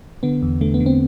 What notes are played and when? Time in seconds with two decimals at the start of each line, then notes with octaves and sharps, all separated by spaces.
0.23 D3 B3
0.42 E2
0.61 D3 A3
0.74 B3
0.80 D3
0.86 C4